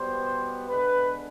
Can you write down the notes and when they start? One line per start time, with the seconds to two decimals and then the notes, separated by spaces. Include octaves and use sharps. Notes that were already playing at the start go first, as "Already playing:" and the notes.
Already playing: B2 G3 B3 C5
0.68 D3 G#3 B3 B4